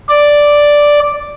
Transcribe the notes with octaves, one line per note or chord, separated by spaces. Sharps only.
D5